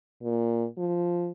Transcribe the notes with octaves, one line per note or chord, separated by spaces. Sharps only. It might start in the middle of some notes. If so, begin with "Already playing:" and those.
A#2
F3